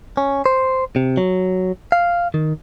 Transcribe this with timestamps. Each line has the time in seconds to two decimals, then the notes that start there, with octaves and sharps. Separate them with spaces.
0.17 C#4
0.46 C5
0.96 C3
1.17 F#3
1.92 F5
2.34 D#3